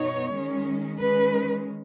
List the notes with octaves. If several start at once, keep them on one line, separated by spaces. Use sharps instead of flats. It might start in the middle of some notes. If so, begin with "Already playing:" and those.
Already playing: B2 B3 D#4 C#5
D#3 G#3 C#4
D#3 G#3 C#4 B4